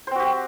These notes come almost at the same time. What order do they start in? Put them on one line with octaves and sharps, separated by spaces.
C5 C4 F#4 G4